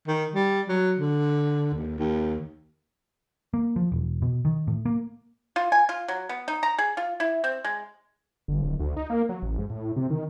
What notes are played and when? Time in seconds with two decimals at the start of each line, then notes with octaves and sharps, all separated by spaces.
0.07 D#3
0.35 G3
0.69 F#3
0.99 D3
1.75 D#2
1.99 D#2
3.54 A#3
3.76 F3
3.92 E1
4.22 B2
4.45 D#3
4.67 A2
4.86 A#3
5.56 F4
5.72 G#5
5.89 F4
6.08 F#3
6.29 B3
6.48 D#4
6.63 A#5
6.79 G#4
6.97 F4
7.20 E4
7.44 C4
7.64 G#3
8.48 G1
8.62 D1
8.80 D2
8.96 D#4
9.10 A#3
9.29 F#3
9.42 A1
9.58 G#2
9.70 A2
9.96 C3
10.10 D#3